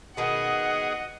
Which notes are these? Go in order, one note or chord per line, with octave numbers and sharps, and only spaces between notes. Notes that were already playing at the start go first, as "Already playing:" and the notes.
B2 D#3 B3 G#4 D#5 F#5